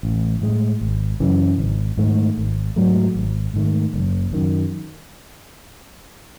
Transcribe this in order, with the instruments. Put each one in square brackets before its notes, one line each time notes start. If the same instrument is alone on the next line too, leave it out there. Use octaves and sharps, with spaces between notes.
[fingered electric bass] A1
A2 G#3
G#1
F#2 C#3 E3
G#1
G#2 D#3 A3
G#1
G#2 F#3 A3
G#1
G#2 D#3 A3
F#1
F#2 D#3